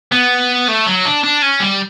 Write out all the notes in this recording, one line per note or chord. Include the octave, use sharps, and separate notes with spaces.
B3
A3
F#3
D4
D4
C#4
G3